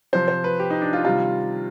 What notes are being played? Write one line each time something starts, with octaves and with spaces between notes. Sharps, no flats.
C3 F3 C5
C5
B4
G4
D#4
D4
F4
C3 D#3 G3 F4